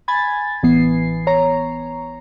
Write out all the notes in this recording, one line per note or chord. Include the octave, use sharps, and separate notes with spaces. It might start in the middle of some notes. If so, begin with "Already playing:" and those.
G#5 B5 G#6 A6
A1 E3 B3 C7
C#5 A#5